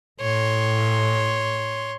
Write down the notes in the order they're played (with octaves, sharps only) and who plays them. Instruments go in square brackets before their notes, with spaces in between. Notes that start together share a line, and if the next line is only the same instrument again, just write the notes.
[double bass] A2 [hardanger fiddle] C#5 C6